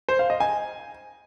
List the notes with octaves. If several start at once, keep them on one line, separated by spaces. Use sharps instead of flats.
C5
F5
D#5
G#5